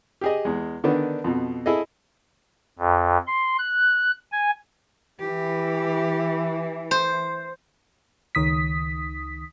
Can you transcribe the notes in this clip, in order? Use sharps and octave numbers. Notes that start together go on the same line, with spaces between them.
G4 G#4 D#5
E2 G#3
D3 D#3 B3 D4
F2 B2
E4 G#4 A4 D#5
F2
C6
F#6
G#5
E3 G4
C5
C#2 D#3 D#6 B6